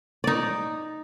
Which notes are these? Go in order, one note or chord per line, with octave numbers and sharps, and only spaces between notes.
D#4 D5